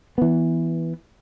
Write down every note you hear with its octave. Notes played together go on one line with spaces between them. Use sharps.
E3 B3